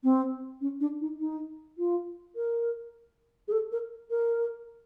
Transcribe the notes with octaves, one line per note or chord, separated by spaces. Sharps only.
C4
C#4
D4
D#4
D#4
F4
A#4
G#4
A4
A#4
A#4